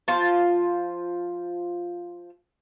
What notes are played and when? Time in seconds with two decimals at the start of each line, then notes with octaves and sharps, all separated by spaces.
0.08 F3 F4 A5